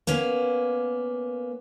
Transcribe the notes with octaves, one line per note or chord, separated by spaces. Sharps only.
A#3 B3 C#4